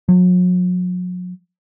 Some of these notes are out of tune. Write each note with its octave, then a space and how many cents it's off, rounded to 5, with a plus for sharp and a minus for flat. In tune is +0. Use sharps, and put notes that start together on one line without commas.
F#3 -40